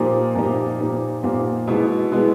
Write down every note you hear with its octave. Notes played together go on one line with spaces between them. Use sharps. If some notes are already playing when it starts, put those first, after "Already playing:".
Already playing: A#2 F3 A#3 D#4 G4
A#2 F3 A#3 D#4 G4
A#2 F3 A#3 D#4 G4
A#2 F3 A#3 D#4 G4
B2 G#3 B3 E4
B2 G#3 B3 E4